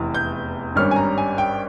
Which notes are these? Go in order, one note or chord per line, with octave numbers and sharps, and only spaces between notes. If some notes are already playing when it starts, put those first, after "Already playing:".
Already playing: F1 E2 E3
G6
G#1 G2 G3 C#4 F6
G#5
A#5
G#5
G5